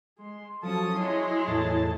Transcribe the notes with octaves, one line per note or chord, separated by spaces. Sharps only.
G#3 C6
F3 F#3 C#4 A4 A5 D#6
F#3 G#3 E4 G#4 C#5 C6
E2 A2 A5